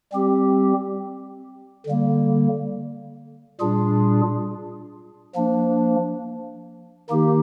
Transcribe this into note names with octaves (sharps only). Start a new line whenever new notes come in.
G3 C4 G4
D3 G3 A#3
A#2 G3 D4 F4 G#4
F3 A#3 D4
D#3 A#3 D#4 G4